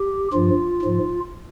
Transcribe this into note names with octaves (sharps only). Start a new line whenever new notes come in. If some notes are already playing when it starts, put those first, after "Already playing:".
Already playing: G4
G2 F3 F4
G#2 F3